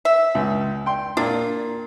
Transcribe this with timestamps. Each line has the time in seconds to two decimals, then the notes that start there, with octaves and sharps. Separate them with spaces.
0.05 E5
0.35 C#2
0.86 G5 C6
1.17 A#2 D4